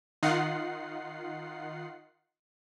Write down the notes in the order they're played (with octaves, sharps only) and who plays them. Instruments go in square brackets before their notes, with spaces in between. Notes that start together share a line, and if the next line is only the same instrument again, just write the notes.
[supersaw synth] D#3 D#4 F4 F#5 C7